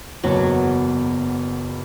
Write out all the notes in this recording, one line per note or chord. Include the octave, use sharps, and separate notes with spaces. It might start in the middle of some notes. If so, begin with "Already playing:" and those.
F#1 E2 B2 F#3